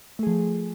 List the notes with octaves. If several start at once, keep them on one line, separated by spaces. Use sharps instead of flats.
F3 A3 G#4